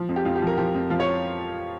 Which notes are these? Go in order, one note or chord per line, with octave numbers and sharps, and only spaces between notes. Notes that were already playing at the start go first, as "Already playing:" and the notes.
Already playing: F3
F2
G4
F2 F4
G4
F3 A#4
F3 G4
F2
F3 F4
C#5